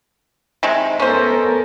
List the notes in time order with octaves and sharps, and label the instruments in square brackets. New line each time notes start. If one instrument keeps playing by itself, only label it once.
[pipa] C3 D#3 G#3
[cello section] B3 A4 A#4 [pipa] C#4 C5